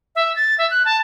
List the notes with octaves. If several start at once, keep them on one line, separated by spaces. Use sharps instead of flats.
E5
A6
E5
F#6
A5